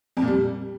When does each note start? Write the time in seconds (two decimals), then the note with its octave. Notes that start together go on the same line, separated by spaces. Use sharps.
0.17 F2
0.22 A#2
0.28 G3